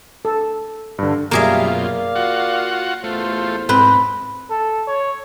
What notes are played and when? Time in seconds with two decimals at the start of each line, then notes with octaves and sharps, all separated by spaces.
0.25 A4
0.99 G2 D3
1.31 F#2 B2 G3 A#3 F4 G#4 E5 F5
1.71 A#4 D5 F5
2.15 F4 F#4 F#5
3.04 A1 E2 A3 F4 C5
3.69 G#2 C4 B4
4.50 A4
4.87 C#5